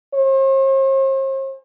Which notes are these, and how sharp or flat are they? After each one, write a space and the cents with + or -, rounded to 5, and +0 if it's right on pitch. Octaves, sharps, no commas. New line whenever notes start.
C5 +45